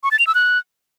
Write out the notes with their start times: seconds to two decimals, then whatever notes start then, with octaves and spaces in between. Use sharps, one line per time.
0.03 C#6
0.11 A6
0.19 F7
0.27 E6
0.35 F#6